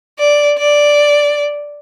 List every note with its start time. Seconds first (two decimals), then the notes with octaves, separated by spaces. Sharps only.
0.19 D5
0.58 D5